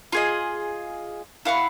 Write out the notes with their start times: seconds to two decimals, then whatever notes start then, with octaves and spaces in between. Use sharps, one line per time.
0.12 F4 G#4 D#5
1.45 E4 F5 F#5 C#6